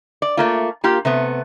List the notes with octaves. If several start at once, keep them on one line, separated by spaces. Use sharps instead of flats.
D5
A3 A#3 F4
A#3 F4 G4
C3 A3 B3